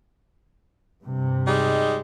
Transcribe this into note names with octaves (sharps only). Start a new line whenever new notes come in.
G2 C3
G3 G#3 D#4